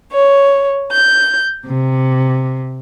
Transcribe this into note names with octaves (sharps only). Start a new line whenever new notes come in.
C#5
G6
C3